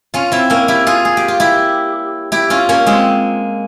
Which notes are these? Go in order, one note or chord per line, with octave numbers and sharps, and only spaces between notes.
C#4 F4
C4 E4
A#3 C#4
E4 G4
F4 G#4
G#4
G4
F4
E4 G4
E4 G4
C#4 F4
A#3 C#4
G#3 C4